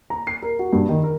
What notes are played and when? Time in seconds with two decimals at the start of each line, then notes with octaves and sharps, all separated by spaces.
0.10 A#5
0.27 C7
0.42 A#4
0.59 F#4
0.73 G2
0.89 D#3
1.04 A#4